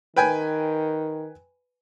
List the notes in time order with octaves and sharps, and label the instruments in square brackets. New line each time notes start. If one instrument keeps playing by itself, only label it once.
[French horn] D#3 [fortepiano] B4 G5 G#5